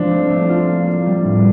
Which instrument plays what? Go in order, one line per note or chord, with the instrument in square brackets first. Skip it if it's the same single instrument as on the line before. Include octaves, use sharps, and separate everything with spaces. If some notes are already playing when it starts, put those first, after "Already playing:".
Already playing: [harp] F3 C4 [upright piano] D4
[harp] A3
A3
F4
A#3
A#3
G3
A2